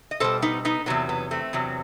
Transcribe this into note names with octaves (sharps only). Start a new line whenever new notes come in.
D#5
B2 G3 A4 C5
B3 D#4
B3 D#4
E2 C3 F#3 B3
B3
A3 C4
E2 C3 F#3